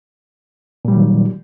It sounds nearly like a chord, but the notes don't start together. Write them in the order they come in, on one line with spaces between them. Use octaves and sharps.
A#2 G3 F#3 D#3